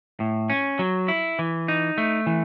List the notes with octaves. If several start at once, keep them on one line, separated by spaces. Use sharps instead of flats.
A2
C#4
F#3
E4
E3
D#4
A3
E3